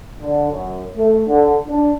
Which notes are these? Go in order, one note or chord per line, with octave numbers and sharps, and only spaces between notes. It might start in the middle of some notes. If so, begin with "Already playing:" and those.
D3
F#2
A3
D3
D4